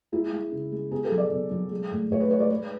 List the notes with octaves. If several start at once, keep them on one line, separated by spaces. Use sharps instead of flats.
G#3 E4
G#3
C#3
G#3
B2 G#4
A4
F#3
D5
B2
F#3
G#3
A2
A2 C#5
B4
G#3 C#5
D5
G#3 B4